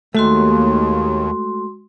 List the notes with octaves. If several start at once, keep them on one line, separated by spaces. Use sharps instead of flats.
D#2 G#3 A3 F#4 C6